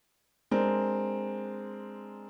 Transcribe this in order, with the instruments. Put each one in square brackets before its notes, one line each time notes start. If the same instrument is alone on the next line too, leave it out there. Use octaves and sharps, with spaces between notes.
[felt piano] G#3 C4 D4 A#4